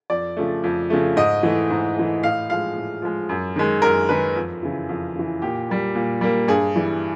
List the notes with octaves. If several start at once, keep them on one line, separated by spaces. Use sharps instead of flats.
F2 D5
C#3 F3 A3
F2
C#3 F3 A3
G#2 D#5
E3 A3
G#2
E3 A3
A2 F5
F3 G#3 F5
A2
F3 G#3
F#2
D#3 G#3
F#2 A#4
D#3 G#3 B4
F2
C#3 E3
F2
C#3 E3
A#2 G4
G3 A#3
A#2
G3 A#3
G2 G#4
E3 G3